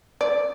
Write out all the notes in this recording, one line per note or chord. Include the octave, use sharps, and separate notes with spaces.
D5